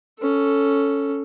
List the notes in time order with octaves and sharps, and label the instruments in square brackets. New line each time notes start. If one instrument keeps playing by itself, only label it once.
[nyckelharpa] C#4 A4